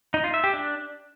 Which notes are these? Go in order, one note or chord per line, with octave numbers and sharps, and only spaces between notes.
D#4
F4
E5
G4
D4